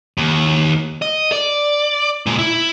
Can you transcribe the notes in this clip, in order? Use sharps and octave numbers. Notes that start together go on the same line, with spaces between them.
D#2
D#5
D5
A#2 G#3
E4